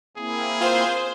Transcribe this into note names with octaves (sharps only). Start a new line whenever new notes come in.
A#3 C4 E4 G#4
F4 C5